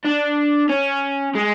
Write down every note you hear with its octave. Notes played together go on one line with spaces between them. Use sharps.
D4
C#4
G#3